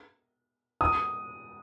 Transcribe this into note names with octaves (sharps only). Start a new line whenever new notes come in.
D#6